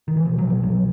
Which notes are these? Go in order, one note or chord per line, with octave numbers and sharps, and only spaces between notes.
D#3
E3
B2 F3
F#3
B2
F3
C2 F#3